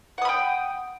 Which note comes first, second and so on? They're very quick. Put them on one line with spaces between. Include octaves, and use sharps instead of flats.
F#5 D#6 B5 G5